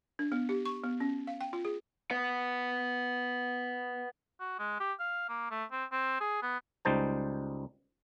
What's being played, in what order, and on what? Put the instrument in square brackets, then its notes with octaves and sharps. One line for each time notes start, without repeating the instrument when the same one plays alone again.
[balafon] D4
B3
G4
C#6
B3
C#4
F5
G5
F4
G#4
[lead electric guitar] B4 F#5
[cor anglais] F#4
G#3
G4
F5
A#3
A3
C4
C4
G#4
B3
[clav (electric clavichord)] C#2 G3 D#4 C5 A5